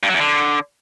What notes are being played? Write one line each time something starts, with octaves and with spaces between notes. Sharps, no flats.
G2
F#3
E2
D3